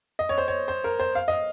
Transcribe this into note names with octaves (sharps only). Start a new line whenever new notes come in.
D#5
C#5
C5
C#5
C5
A#4
C5
F5
D#5